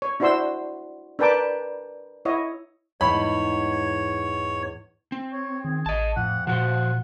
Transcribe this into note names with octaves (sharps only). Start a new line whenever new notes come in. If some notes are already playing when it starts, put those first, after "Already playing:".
C#5
D4 E4 F#4 C5 C6 E6
D4 A#4 B4 G5 A5 D6
E4 C#5 D#5
E2 G#2 C#5 B5
C4
C#5
D#3 G#4
A1 D#5 A5
F2 A2 F#5
A#2 F3 F#4 C5 F#5